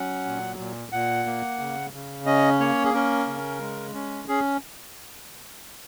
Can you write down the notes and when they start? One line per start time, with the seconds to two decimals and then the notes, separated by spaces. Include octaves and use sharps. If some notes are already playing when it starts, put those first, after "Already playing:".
Already playing: F#3 C#4 F#5
0.25 A#2
0.58 A#2
0.92 A#2 F#5
1.26 A#3
1.59 C#3
1.93 C#3
2.26 C#4 D#5
2.60 A#3 C#5
2.85 G#4
2.93 C#4 A#4
3.27 C#3
3.60 G#3
3.94 C#4
4.28 C#4 G#4